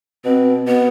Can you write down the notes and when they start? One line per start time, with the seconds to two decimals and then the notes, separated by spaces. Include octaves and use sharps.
0.25 B2 C4
0.67 B2 B3